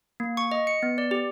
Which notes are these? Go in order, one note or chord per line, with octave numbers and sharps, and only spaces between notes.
A#3
C#6
D#5
C#7
B3
D5
G4